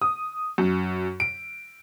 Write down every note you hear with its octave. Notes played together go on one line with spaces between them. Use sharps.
D#6
F#2
D7